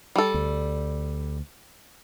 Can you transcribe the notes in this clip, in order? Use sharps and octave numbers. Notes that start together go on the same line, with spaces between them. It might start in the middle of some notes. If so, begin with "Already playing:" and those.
G3 A4
D2